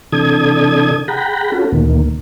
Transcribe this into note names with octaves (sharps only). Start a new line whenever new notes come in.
C3 E3 D4 A4 D#6 G#6
G#4 F#5 G5 A#5 B5
C#4 F4 F#4 A4
D2 A#2 D#3 A#3